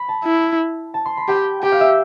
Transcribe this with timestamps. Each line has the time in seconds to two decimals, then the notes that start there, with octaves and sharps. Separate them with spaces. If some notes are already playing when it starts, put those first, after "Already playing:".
Already playing: B5
0.08 A5
0.25 E4
0.94 A5
1.05 C6
1.17 B5
1.28 G4 G5
1.63 G4 G5
1.72 F5
1.80 E5